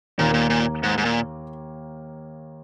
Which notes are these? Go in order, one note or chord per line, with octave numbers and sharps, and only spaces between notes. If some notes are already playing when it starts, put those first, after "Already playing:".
D#2 A#2 D#3 A#3
A#2
A#2
G#2
G#2
A#2